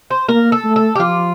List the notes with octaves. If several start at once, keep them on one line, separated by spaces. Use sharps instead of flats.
C5
A#3 A#4
A4
A3
A4
G4
F3 F4